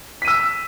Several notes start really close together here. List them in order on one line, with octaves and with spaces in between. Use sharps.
B6 D#7 E6